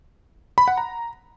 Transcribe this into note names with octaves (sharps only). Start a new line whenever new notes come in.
B5
F#5
A#5